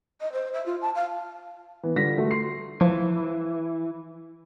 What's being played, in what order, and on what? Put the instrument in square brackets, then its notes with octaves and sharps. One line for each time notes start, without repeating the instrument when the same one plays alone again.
[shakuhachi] D#5
C5
E5
F4
A5
F5
[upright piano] E3 B3
D3 G3 F4 A#6 B6
A3 F#4
C6 C7
[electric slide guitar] E3 [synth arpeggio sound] F3